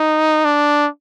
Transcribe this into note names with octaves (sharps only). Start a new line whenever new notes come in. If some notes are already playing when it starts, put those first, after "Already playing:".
Already playing: D#4
D4